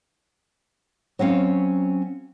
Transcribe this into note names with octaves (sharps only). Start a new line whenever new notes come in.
F#3 C4 C#4 F5